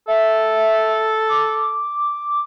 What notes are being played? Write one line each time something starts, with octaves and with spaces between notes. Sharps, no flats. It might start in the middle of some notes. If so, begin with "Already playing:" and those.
A4 E5
D6